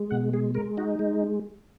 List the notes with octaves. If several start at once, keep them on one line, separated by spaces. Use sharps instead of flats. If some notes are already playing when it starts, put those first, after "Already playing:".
Already playing: G#3
B2 F#5
G#3 G#4
G#3 A#4
D#4 F#4
G#3